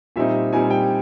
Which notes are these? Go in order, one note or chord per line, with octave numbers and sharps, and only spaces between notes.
A#2 G3 C4 D#4 E5
A#2 G3 C4 D#4 G#5
G5